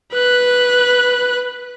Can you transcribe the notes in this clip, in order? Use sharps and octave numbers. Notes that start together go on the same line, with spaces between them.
B4 F#6